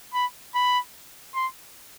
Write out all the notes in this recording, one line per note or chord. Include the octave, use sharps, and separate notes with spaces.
B5
B5
C6